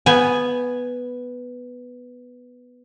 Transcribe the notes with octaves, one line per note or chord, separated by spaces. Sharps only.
B3 G#5